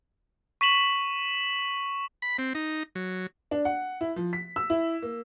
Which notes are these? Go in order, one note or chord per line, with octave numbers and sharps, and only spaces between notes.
C#6 B6 E7 F#7
B5
C4
D#4
F#3
D4
F#5
E4
F3
B6
E6
E4
A#3